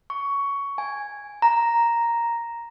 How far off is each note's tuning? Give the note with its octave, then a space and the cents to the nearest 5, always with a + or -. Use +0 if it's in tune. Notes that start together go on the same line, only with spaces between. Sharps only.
C#6 +15
G#5 -5
A#5 +0